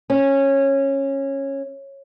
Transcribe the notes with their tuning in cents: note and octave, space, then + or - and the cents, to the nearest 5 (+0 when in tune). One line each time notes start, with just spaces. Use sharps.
C#4 -15